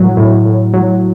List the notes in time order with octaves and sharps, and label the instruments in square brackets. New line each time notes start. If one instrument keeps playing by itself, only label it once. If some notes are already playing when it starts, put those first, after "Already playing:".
Already playing: [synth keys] A2 F#3
A2
A2
F#3